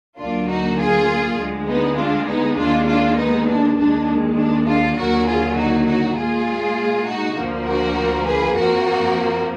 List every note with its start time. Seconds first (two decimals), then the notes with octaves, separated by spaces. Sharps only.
0.18 D2 D3 F#3 A#3 D4 F4
0.48 D#4 F#4
0.78 F4 G#4
1.38 D2 D3 G#3
1.68 B3 D#4
1.98 D4 F4
2.28 B3 D#4
2.58 D#2 D#3 G#3 D4 F4
2.87 D4 F4
3.17 B3 D#4
3.48 D4
3.77 D#2 D#3 G#3 D4
4.37 D4
4.67 D4 F4
4.97 D#2 D3 F#3 A#3 F#4 A#4
5.27 F4 G#4
5.56 D#4 F#4
5.86 D#4 F#4
6.16 A#2 G#3 F4 G#4
7.06 D#4 F#4
7.36 D2 D3 F3 A#3
7.66 F#4 A#4
8.26 G#4 B4
8.55 F2 F3 A#3 F#4 A#4